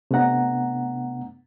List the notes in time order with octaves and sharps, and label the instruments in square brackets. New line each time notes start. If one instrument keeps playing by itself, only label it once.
[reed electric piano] C3 A3 B3 D4 F#5 A#5